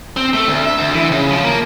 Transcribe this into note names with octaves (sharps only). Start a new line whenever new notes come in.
C4
A3
D2
E5
D2
E3
C#3
F3
A#3